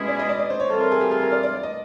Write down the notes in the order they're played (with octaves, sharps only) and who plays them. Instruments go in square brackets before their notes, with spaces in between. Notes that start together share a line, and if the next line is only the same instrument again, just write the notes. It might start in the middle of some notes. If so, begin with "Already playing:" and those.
Already playing: [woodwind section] B2 G#3 C#4 E4 G#4
[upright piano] D5
D#5
D5
D5
C5
C#5
[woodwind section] E3 G3 C4 F4 [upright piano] A4
[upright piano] A#4
G#4
G4
G#4
A#4
D5
D5
D5
D#5